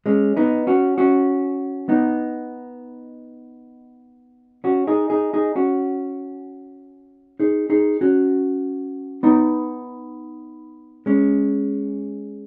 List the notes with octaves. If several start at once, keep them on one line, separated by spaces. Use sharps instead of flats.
G#3 C#4
B3 D#4
C#4 F#4
C#4 F#4
B3 D#4
C#4 F#4
D#4 G#4
D#4 G#4
D#4 G#4
C#4 F#4
D#4 G#4
D#4 G#4
C#4 F#4
B3 D#4
G#3 C#4